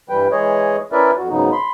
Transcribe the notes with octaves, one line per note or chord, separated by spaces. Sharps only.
G2 E3 G3 B4 G5
E3 G#3 G#4 C#5 D#5
C#4 E4 A#4 B4 D5 E5
F2 F#4
G#2 C#3 F#3 B3 D#4
B5 C6